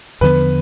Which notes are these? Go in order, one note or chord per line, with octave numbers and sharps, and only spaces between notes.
E2 D3 F3 B3 B4